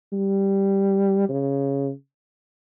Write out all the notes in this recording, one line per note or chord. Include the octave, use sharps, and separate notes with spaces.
G3
C#3